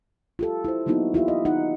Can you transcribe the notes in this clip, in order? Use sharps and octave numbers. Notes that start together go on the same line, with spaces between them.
F4 G4 A4
E4 C5
F#3 A#3 B3 D#4 E4 F#4
E4 F4 G4 E5
D#5
D#4 F#5